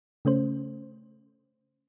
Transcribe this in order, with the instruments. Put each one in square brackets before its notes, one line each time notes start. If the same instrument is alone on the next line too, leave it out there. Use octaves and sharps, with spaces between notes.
[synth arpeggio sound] C#3 A3 C#4 C5